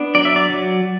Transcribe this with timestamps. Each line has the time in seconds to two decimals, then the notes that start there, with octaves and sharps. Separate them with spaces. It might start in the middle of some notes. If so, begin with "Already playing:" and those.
Already playing: B3 D4
0.15 F#3 D5
0.25 E5
0.36 D5
0.50 F#3